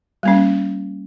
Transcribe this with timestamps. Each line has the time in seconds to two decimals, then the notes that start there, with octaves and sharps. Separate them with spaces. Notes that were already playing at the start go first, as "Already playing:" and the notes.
0.23 G3 A#3 C#4